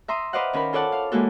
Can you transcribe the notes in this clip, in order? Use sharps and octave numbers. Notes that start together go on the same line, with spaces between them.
E5 A#5 C6 D#6
B4 C5 D5 D#5 F5 F#5
D#3 C#4 A#4 B5
F4 A4 C#5 D5 F#5 A5
F5
E3 G#3 A#3 F#4 A4